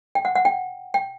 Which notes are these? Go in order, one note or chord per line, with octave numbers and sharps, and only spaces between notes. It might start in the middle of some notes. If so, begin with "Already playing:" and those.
G5
F#5
F#5
G5
G5